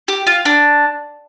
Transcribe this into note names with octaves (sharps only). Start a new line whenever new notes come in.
G4
F4
D4